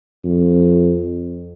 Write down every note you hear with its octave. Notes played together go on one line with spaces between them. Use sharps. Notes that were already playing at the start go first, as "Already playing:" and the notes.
F2